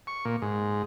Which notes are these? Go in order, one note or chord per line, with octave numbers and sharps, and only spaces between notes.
C#6
A#2
G#2